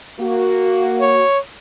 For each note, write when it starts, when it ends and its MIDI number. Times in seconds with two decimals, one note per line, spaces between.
0.20 1.23 58
0.20 1.23 66
1.01 1.39 73